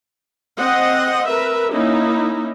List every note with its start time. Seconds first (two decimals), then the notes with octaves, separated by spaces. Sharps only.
0.57 C4 C5 D#5 F#5
1.27 A#4 B4 E5
1.72 A#3 C#4 D#4 E4